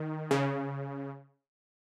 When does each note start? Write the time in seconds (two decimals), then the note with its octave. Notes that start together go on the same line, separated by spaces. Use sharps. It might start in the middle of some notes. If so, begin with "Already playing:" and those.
Already playing: D#3
0.31 C#3